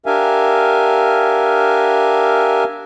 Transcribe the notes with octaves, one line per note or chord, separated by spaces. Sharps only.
D4 G4 A#4 E5 F5 G#5